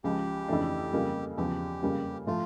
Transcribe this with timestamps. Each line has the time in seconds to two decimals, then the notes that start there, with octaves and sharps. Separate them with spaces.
0.04 C#2 C#3 F3 G4
0.48 F2 C#3 E3 A3 D4
0.93 F2 C#3 G3 A#3
1.37 E2 C#3 F3 G4
1.82 F2 C#3 G3 A#3 C#4
2.26 A2 F3 A3 F4